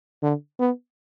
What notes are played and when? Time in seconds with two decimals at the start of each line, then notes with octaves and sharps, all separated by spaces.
0.22 D3
0.59 B3